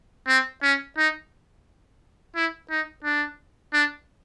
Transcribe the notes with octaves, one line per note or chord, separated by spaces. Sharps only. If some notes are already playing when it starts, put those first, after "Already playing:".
C4
C#4
D#4
E4
D#4
D4
D4